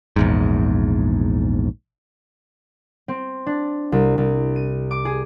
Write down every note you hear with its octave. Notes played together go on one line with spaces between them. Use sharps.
A#1 E2 G#2
C4
D4
C2
C2
D#7
D6
G#4